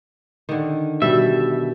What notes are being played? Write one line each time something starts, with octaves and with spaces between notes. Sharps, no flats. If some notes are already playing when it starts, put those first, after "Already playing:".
D3 D#3
B2 G3 E5